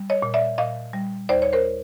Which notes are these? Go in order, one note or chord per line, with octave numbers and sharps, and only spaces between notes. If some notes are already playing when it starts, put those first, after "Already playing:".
Already playing: G3
C#5 D#5
A#2
D5 E5
A#2 D#5 F5
G3
D#2 C5 D5
C#5
A#4 C5